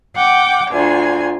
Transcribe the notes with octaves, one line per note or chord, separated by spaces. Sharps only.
F#5 G5 D6
D2 F4 G#5